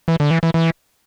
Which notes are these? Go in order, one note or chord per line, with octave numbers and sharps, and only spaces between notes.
E3
D3
E3
E3
E3